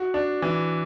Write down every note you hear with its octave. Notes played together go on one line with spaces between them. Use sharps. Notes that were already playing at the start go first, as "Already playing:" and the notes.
Already playing: F#4
D4
E3